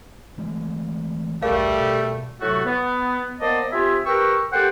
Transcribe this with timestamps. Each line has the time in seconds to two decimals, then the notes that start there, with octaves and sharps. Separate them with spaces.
0.38 E3 G#3 A3
1.42 D#1 B1 G3 A3 G#4 A#4 F5
1.80 B2
2.41 A2 C3 F#3 A3 F#4
2.65 B3
3.41 A#3 B3 C5 D5 D#5 A5
3.72 C4 F4 G4 G#4 E5
4.06 G4 A#4 B4 G5 C#6 E6
4.53 A#3 G4 A4 C5 F#5 G5